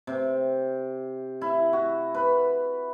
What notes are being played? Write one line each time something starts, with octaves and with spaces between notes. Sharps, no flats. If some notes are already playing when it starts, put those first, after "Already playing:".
C3
E4
F#4
B4